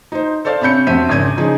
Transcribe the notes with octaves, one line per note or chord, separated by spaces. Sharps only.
D#4 C5
A4 C5 D5 F5
C3 C#4 B5 G6 C#7
F2 F#4 C5 E5 D#7
G#1 C#3 G#6 D#7
C#3 F3 D#4 G#4